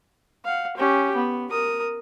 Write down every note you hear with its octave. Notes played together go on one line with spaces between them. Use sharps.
F5 F#5
C#4 G4
B3
A#4 D#6